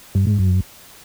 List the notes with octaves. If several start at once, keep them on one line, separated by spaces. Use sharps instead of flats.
G2
G#2
F#2